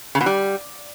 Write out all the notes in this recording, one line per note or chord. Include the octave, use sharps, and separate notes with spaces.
C#3
B2
G3